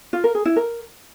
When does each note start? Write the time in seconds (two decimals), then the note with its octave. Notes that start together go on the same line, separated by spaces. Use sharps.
0.13 F4
0.24 A#4
0.35 G#4
0.45 E4
0.56 A#4